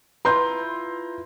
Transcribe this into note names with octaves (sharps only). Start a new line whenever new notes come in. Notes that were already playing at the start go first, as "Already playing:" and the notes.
E4 F4 B4 A#5 C6 G6